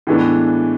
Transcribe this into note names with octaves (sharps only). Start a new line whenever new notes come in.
A2 E3 G#3 B3 D4